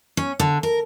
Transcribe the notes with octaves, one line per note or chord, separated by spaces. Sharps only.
C#4
D3
A#4